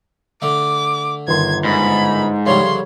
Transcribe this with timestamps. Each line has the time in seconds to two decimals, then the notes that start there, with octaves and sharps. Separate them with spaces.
0.42 D3 A3 D6
1.28 G1 D#3 C6 G#6
1.65 G#2 B5
2.46 D2 C#3 F3 G3 C#5 C6